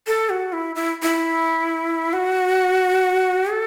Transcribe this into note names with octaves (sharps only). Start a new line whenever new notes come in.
A4
F#4
E4
E4
E4
F#4
A4